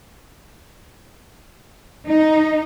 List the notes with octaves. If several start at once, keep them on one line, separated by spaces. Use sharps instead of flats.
D#4